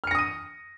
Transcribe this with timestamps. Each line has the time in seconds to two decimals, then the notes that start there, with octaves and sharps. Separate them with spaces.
0.04 F6
0.07 C#7
0.11 A#6
0.15 D#6
0.19 D#7